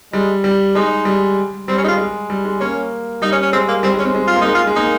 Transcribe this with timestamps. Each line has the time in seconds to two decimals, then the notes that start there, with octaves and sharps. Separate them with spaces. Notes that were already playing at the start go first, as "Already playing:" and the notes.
0.13 G3 G#3
0.44 G3
0.75 G#3 D#4
1.05 G3
1.68 G3 C4
1.78 C#4
1.84 G#3 D#4
1.88 F4
1.98 G#3
2.30 G3
2.45 G#3
2.60 A#3 C#4
3.22 G3 D#4
3.32 C#4
3.42 C#4
3.53 G#3 C4
3.68 A#3
3.83 G3 C4
3.94 G#3
3.99 C#4
4.05 C4
4.15 G#3
4.27 F4
4.36 A#3
4.41 G#3 D#4
4.54 F4
4.67 G#3
4.76 A#3 D#4